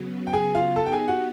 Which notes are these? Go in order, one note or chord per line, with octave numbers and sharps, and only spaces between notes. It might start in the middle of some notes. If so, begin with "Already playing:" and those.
Already playing: C#3 F#3 B3
G5
G#4 G#5
F4 F5
B3 D#4 G4 A4 A5
G5
G#4 G#5
F#4 F#5